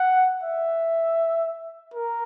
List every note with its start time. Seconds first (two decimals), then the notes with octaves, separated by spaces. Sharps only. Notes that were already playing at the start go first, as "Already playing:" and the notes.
Already playing: F#5
0.43 E5
1.94 A#4